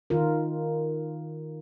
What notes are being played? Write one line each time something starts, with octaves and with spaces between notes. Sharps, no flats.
D#3 F4 A#4